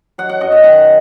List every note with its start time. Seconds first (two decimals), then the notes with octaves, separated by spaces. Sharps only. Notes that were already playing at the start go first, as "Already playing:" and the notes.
0.18 F#3 F#5
0.29 F#5
0.41 F#2 D#5
0.52 E5
0.64 D#3 F#5